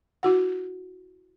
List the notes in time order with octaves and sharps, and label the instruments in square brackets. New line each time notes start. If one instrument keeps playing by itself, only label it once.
[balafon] E4 F#4 F#5